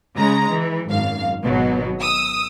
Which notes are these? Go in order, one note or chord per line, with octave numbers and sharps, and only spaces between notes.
C#3 G#3 A#5
E3
G#1 F#2 F5
G#1 B2 F#3
D#6 E6